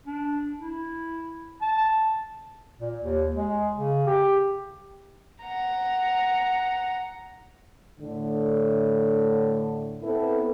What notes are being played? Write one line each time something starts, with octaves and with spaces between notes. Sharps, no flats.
D4
E4
A5
A#2
D#2
G#3
C#3
G4
F#5 A#5
A2 D3
B3 C4 E4 A4 B4